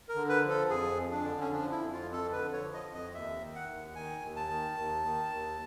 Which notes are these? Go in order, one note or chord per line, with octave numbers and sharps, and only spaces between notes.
A#4
D3
B4
F3
A4
F2 G#4
F2
D4
D3
C#4
F3 D4
E4
F2
F4
F2
A4
D3 B4
C#5
F3
D#5
F2
D#5
D#2 E5
D#3
F#5
D#2
D#3 G#5
D#2
A5
D#3
D#2
D#3
D#2